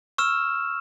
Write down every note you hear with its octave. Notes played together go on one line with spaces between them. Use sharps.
C#6 E6 F6 E7